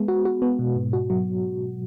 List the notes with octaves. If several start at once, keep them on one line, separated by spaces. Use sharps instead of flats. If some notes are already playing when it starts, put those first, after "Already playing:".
Already playing: G#3 B3
F#4
F#4
B3
B2
G#2
F#4
F#3